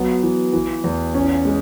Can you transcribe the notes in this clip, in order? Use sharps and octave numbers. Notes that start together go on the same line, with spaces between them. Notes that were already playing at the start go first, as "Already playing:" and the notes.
Already playing: F#3 B3
E3
E3
E2
C#4
G#3